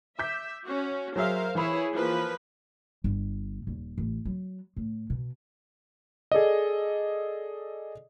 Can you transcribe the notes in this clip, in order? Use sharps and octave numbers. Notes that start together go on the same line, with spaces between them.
E5 D6 G6 B6
C#4 F#4
F#3 G#4 A#4 C5 E5 F5
E3 E4 G#4 C#5 B5
F3 A#3 B4
G1
D#1
A1
F#3
A2
B2
G#4 A4 D5 D#5